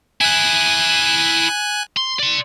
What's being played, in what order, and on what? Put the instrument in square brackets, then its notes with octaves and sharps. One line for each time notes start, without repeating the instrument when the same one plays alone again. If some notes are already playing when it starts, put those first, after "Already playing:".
[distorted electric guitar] E4 G#4 [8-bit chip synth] G#5 F#6
[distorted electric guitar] C6
D5 C6